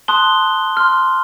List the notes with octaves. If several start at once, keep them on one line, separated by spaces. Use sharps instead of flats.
A5 C6 D#6 F#6 G7
C6 F6